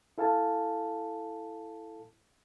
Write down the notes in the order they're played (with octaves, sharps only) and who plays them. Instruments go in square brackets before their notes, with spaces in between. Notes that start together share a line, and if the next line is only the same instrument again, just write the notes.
[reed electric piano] E4 A4 F5 G#5 A5